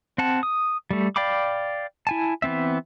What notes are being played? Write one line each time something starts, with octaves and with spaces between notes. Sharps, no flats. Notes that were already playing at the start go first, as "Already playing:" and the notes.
C4 F#5 A5
D#6
G3 A3
D5 F5 G5 B5 D6
E4 G#5 A5
E3 B3 C4 E5